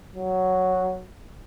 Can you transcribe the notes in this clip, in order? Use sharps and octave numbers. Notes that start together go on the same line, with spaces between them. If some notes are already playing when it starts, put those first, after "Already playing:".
F#3